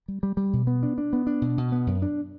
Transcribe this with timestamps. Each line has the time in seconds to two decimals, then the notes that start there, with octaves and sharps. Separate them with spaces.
0.08 G3
0.23 G3
0.37 G3
0.53 B2
0.67 B3
0.83 D4
0.98 D4
1.13 B3
1.27 D4
1.42 B2
1.58 B2
1.72 B3
1.87 F#2
2.02 D4